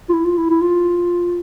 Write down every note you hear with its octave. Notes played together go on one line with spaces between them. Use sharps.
F4
E4
F4
E4
E4
F4